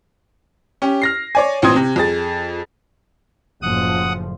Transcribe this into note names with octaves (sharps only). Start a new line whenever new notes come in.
C#4 G4
F6 A#6 C7
C#5 D5 G#5
A1 A#2 C4 C6 D#6 G#6
C3
F2 G#4 A6
F#1 A2 F3 F#5 D#6